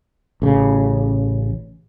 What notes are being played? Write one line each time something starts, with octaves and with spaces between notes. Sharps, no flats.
A1 C#3